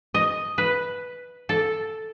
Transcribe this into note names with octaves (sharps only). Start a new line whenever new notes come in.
D#5
B4
A4